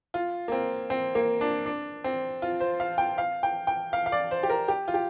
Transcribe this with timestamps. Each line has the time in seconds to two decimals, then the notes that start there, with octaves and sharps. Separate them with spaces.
0.14 F4
0.48 A#3
0.52 C4
0.90 C4
1.15 A#3
1.41 D4
1.66 D4
2.04 C4
2.42 F4
2.60 C5
2.80 F5
2.98 G5
3.18 F5
3.43 G5
3.67 G5
3.93 F5
4.06 F5
4.12 D5
4.31 C5
4.43 G4
4.50 A#4
4.68 G4
4.88 F4
4.94 G4